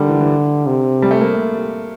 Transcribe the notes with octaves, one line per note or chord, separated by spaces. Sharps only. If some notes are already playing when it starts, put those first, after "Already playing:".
Already playing: D3 G3 A#3
E3
E3
C3
G3
A3
A#3